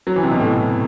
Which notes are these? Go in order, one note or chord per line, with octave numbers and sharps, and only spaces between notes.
F#3
E3
C3
B2
A2